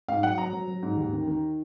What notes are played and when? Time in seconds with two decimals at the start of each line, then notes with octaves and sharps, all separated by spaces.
0.08 G#2 F5
0.22 F#3 F#5
0.38 F#3 A#5
0.53 F#3
0.68 F#3
0.83 G#2
0.97 D#2
1.13 D#3
1.27 D#3